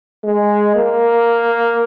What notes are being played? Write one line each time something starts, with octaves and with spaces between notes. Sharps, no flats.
G#3
A#3